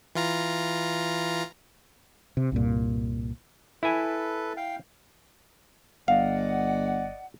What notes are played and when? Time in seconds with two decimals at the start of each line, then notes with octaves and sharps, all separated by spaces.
0.15 E3 F4 A#5
2.37 C3
2.52 C2 G2 A#2
3.83 E4 A4 B4 G#5
4.57 F5 G5
6.08 G1 D5 D#5 F5 F#5